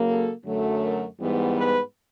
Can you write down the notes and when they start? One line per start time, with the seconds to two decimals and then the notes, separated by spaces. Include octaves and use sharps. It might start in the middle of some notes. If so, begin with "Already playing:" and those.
Already playing: C#3 F#3 A#3
0.09 A4
0.46 F#2 D3 F#3 A3
0.83 A#4
1.20 G#2 E3 G3 B3
1.57 B4